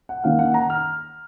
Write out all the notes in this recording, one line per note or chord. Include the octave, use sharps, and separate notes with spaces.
F#5
D#3 A#3 C#4 F5
F#5
A#5
F6